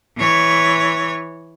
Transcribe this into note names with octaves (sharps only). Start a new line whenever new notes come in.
E3 C#5